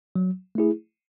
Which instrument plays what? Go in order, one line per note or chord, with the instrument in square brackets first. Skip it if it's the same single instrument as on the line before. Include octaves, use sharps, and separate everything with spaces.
[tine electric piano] F#3
A3 E4 G#4